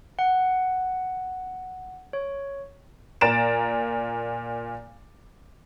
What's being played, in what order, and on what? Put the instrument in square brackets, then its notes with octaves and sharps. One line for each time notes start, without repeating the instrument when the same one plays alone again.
[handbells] F#5
C#5
[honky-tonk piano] A#2 A#5 A6 D7 E7